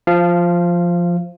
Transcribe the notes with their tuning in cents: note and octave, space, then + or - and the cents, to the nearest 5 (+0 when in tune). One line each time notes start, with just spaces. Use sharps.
F3 +0 F5 -20